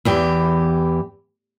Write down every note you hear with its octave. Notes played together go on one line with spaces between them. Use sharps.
E2 E3 G4